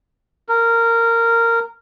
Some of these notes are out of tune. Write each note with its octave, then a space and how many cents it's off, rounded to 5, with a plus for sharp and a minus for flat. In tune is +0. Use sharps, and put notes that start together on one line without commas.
A#4 -15